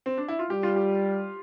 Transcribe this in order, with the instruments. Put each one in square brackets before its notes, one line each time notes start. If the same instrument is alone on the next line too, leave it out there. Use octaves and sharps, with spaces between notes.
[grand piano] C4
D4
E4
F4
[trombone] G3 [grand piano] G4
[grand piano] F4
G4